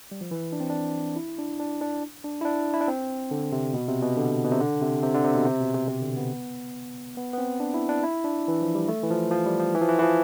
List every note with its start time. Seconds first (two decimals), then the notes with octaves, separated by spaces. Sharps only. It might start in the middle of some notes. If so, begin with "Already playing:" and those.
0.11 G3
0.21 F3
0.31 E3
0.52 D4
0.60 C4
0.70 D4
1.16 E4
1.38 D4
1.60 D4
1.81 D4
2.24 D4
2.41 E4
2.45 D4
2.74 E4
2.81 D4
2.88 C4
3.31 D3
3.52 C3
3.74 B2
3.88 C3
4.02 B2
4.17 D3
4.44 B2
4.52 C3
4.60 D3
4.81 C3
5.02 C3
5.14 D3
5.24 C3
5.35 B2
5.46 C3
5.60 B2
5.74 C3
5.88 C3
6.02 D3
6.17 B3
7.17 B3
7.33 B3
7.38 C4
7.60 D4
7.74 E4
7.89 D4
8.03 E4
8.24 D4
8.48 E3
8.62 F3
8.75 G3
8.88 A3
9.03 E3
9.11 F3
9.31 F3
9.46 G3
9.60 F3
9.74 E3
9.82 F3
9.89 E3
9.99 E3
10.03 F3